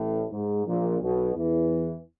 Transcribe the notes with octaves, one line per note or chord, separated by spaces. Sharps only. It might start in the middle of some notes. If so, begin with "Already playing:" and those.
Already playing: A1 A2
G#2
A#1 A#2
B1 B2
E2 E3